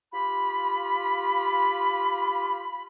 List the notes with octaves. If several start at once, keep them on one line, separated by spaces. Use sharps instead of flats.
F4 G4 B5